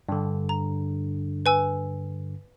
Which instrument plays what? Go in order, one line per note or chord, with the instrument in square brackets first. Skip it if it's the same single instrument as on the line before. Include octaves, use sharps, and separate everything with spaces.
[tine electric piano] G2 D3
[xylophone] A#5
B4 G#5 E6